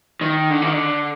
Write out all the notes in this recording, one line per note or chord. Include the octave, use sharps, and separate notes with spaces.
D#3
D3
D#3
D3